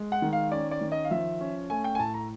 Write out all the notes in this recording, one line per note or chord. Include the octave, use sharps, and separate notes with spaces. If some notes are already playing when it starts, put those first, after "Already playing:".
Already playing: G#3
F#5
D#3
F5
C#4 D5
D5
D#3
D#5
F5
F3 E5
C#4
A3 G#5
G5
G#5
A2 A5
A#5